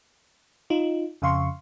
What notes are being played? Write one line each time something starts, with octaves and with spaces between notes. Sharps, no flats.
D#4 F4
F2 C#3 F5 C6 C#6